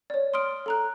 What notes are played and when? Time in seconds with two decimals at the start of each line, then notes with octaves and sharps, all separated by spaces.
0.10 C#5 D5
0.34 C6 D#6 F6 D7
0.66 A4 A#5 F#6